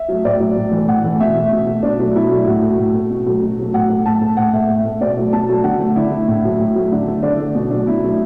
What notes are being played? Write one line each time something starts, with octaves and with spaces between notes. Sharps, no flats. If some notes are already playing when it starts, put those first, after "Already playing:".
Already playing: E5
F#3 A3
A2 D5
F#3 A3
A2
E3 A3
A2 F#5
E3 A3
B2 E5
A3
B2
A3
B2 D4
F#3 A3
B2 E4
F#3 A3
A2 F#4
A3
A2
A3
B2
F#3 A3
B2
F#3 A3
A2 F#5
A3
A2 A5
A3
A2 F#5
A3 E5
A2
A3
B2 D5
F#3 A3
B2 A5
F#3 A3
D3 F#5
A3
D3 E4
A3
A2
F#3 A3
A2
F#3 A3
D3
A3
D3 D4
A3
B2
F#3 A3 D4
B2 E4
F#3 A3